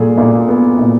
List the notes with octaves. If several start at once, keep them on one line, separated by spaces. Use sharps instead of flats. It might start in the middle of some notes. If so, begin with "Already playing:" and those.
Already playing: A#2 G3 G#4 A4
A#2
B3
A#2